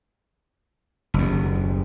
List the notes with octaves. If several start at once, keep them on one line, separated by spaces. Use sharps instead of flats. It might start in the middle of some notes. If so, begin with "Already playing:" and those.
F#1 D#2